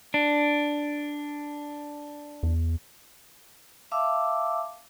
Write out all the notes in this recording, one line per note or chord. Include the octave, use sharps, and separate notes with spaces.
D4
E2
E5 F5 A5 D6 E6